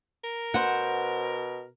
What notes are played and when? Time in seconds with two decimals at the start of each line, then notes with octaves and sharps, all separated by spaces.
0.24 A#4
0.54 B2 C5 F#5